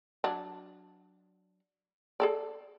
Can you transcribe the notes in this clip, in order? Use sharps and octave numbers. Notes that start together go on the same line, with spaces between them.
F#3 D4
G#4 A4 D5